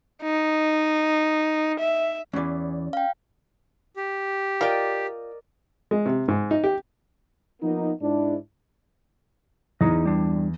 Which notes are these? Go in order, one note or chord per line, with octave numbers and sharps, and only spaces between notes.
D#4
E5
E2 E3 C#4 D5
F5 G5
G4
F4 A#4 D5 D#5 G5
G#3
C3
G#2
D#4
G4
F3 A#3 B3 D#4
G#2 D4 E4
E2 D#4 G#4 D#5
G3 D4